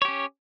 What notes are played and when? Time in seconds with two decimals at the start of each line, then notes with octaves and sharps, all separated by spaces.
0.02 C#5
0.05 G4
0.08 C#4